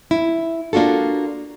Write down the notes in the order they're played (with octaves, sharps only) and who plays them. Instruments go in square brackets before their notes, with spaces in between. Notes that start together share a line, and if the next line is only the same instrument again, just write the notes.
[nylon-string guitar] E4
A#3 D4 F4 F#4 A4